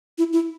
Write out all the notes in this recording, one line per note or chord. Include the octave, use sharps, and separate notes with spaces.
E4
E4